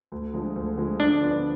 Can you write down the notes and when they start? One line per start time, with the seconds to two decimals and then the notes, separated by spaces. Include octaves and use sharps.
0.12 D2
0.34 D3 F3 G#3
0.56 D2
0.78 D3 F3 G#3
1.00 D3 D4
1.21 F3 B3